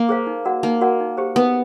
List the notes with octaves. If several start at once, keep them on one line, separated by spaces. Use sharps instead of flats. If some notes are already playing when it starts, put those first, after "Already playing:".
Already playing: A#3
G#4 C5 F5
D#4
F#4 A#4 D5 F#5
A#3 D#4
F#4 A#4 D5 F#5
D#4
G4 C5
B3 D#4